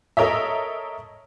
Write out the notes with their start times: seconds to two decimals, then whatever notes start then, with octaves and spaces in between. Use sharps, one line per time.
0.17 A4 A#4 C#5 D#5 E5